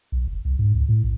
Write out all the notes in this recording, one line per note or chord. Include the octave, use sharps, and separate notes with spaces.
B1
F1
C2
G#2
C#2
A2
A#1